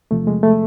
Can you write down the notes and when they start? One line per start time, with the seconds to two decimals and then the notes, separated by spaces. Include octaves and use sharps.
0.11 E2 C3 F3 A3
0.27 G#3
0.43 A3